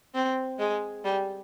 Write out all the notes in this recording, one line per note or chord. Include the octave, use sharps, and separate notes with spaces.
C4
G#3
G3